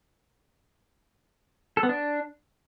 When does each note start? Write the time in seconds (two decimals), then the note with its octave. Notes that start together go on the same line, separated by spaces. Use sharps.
1.77 A4
1.83 B3
1.89 D4